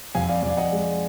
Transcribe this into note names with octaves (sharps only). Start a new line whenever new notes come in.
F2 F5 G#5
D5 F5
F2 D5
F5
D#5 F#5
G#3